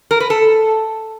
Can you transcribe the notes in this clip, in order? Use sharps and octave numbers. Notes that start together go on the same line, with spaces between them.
A#4
B4
A4